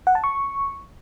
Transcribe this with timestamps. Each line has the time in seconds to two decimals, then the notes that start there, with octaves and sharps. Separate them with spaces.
0.07 F#5
0.15 A5
0.24 C#6